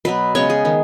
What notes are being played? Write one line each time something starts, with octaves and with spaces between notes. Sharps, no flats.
B2 F#3 B3 B4
C#3 G#3 B3 C#5
G#4
D#3 B3